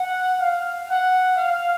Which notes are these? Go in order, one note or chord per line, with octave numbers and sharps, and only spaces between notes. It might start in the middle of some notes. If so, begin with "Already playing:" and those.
Already playing: F#5
F5
F#5
F5